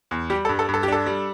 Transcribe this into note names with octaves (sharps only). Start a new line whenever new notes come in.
E2
G3 G4
A4
G2
A4
G2
A4
G4
D4 A4
G3